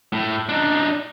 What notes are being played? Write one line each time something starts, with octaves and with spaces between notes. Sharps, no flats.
A2
D4 D#4